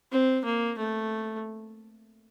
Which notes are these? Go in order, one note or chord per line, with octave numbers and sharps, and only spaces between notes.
C4
A#3
A3